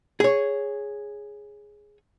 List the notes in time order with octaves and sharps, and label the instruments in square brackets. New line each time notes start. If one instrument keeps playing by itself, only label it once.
[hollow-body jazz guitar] G#4 C#5